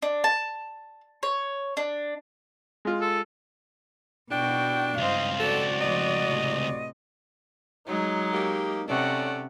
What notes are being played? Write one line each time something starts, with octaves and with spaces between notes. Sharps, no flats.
D4
A5
C#5
D4
G#3 F4
A4
B2 D4 F#4 G5
C#2 G2 C4 C5 D#5 F5
F#4 A4 D5 F#5
D2 F3 D#5
A2 C3
F#3 G#3 D#4
A#3 G4
C3 C#4 A4 C#5 D5 F#5